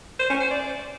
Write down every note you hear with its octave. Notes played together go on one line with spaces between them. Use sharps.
C5
C#4
C5
D5